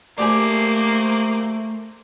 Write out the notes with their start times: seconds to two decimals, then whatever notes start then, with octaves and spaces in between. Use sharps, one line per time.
0.18 A3 A#3 D4 G4 G#4 C5 D6